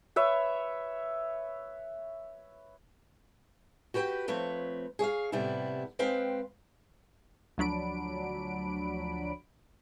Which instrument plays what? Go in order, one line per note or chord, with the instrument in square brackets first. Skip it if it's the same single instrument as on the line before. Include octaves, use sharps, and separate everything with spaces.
[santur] B4 C#5 E5
[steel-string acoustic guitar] F#4 G4 B4 G5
F3 A3 C4 B4 C#5
G#4 C#5 E5 F5
A2 C3 G3 B3 E4
G#3 C4 B4 F5 G5
[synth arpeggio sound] D2 F3 F#3 D4 B5 D7